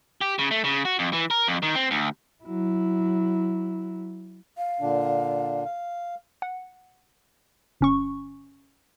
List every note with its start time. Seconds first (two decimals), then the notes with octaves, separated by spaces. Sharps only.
0.21 G4
0.39 C#3
0.51 A3
0.65 C#3
0.85 F#4
0.99 F2
1.13 E3
1.31 A#4
1.47 F2
1.63 D#3
1.75 C4
1.91 D2
2.44 F#3 E4
4.58 F5
4.81 A#2 D3 D4
5.65 F5
6.42 F#5
7.80 G1 C#4 C#6